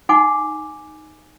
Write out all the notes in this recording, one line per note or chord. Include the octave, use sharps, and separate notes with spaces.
D#4 F#5 G#5 D6